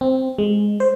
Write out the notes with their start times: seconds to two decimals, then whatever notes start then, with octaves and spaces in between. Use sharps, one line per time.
0.01 C4
0.38 G#3
0.80 C5